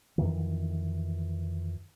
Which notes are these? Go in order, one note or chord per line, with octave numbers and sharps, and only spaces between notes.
F2 C3 D#3 E3